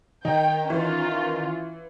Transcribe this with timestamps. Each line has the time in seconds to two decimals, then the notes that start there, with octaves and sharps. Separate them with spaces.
0.25 D#3 D#4 G5
0.70 E3 C#4 F4